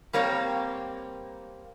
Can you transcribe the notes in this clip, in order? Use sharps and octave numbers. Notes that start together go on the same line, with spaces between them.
G3 A#3 C4 C#5